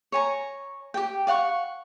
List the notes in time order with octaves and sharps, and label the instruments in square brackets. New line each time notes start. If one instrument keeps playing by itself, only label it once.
[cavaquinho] C#5 G#5 A#5
G4 G5
D5 F5 F#5 C#6